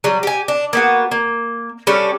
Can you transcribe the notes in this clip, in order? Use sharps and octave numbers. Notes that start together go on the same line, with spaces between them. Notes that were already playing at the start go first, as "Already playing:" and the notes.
F#3 G3
G4 G#5
D4
A#3 B3 F#4
A#3
G3 C#4 D4 A4